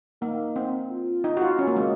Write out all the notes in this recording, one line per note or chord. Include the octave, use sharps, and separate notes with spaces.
A#3 D#4
C4
F4
D#4
F#4
F4
C#4 F#4
A#3
G#3